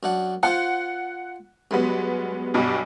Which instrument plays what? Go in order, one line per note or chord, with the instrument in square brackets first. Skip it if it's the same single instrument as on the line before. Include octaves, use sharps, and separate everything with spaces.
[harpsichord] F#2 D4 F#5
[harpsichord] F4 C5 [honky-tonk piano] F#5
[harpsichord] F#2 [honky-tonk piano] G3 G#3 B3
[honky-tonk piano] B1 G2 B2